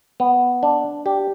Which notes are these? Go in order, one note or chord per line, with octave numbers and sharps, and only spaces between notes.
B3
D4
G4